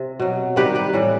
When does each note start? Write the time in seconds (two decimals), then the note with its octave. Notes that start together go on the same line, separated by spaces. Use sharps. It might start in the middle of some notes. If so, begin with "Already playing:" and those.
Already playing: C3 C4
0.20 B2 F#3
0.56 C3 D#3 G3 G4 B4
0.75 G4 B4
0.93 A2 E3 G3